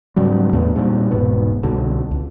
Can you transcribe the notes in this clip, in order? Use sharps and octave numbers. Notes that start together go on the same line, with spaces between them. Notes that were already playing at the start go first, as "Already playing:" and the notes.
G#2 C#3 F#3 G3
E2 A2 B3 D4
A#2 G3 C4
E1 G#2 B2 B3
C2 B2 D3
C#2